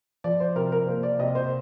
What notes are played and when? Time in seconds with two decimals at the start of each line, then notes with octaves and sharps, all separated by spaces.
0.24 F3 D5
0.40 C5
0.55 C3 A#4
0.72 A#4
0.87 A#3 C5
1.03 D5
1.19 C3 D#5
1.35 C5